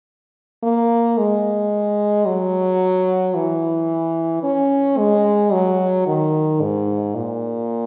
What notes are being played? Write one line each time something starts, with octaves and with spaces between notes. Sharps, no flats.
A#3
G#3
F#3
E3
C#4
G#3
F#3
D#3
G#2
A#2